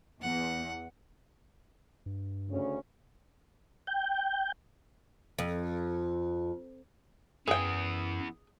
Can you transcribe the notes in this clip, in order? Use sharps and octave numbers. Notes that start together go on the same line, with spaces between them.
E2 F#5
G2
D2 C#3 C#4
G5
F2
F#2 E3 B3 G#4 G5